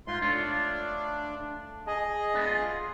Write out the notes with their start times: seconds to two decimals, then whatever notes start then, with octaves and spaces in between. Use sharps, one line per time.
0.07 G#2 F4 C6
0.22 A3 D4 F4 C#5
1.87 G#4 D#5 G#5
2.34 G#3 B3 D4
2.47 F4